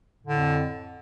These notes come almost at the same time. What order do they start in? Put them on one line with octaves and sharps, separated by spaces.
A2 D3 F2